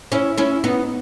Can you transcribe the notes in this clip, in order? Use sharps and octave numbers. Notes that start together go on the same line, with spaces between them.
C#4 E4
C#4 E4
B3 D#4